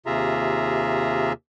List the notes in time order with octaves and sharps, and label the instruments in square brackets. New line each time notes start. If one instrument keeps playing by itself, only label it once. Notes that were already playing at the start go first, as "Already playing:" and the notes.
[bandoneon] D#2 C3 F4 G#4 E5 A#5